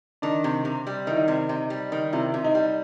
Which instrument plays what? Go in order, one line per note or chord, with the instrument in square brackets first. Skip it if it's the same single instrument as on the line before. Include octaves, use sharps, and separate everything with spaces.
[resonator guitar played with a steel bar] D#3 [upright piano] D4
[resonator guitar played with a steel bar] C3
C3
G3
[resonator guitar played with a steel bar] D#3 [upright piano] E4
[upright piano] D#4
[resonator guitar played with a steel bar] C3
[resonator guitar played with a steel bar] C3 [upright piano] D#4
[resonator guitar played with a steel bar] G3
D#3
[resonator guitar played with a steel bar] C3 [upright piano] E4
[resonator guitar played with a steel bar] C3 [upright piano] E4
[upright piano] D#4
[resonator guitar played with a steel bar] G3